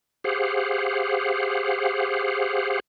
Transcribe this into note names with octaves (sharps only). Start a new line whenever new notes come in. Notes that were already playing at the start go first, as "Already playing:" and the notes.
G4 G#4 C5 F5 F#5